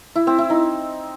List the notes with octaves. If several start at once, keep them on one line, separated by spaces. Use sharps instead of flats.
E4
C4
E4
D#4